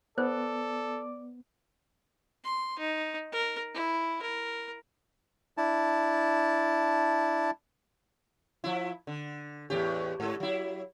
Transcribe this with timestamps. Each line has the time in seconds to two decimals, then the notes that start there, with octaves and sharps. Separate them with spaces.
0.18 B3 A4 C5 D5
2.44 C6
2.79 D#4
3.32 A#4
3.74 E4
4.22 A#4
5.58 D4 E4 A5
8.64 F3 E4
9.07 D3
9.70 E2 A2 G4
10.20 G#2 A4
10.40 F#3 E4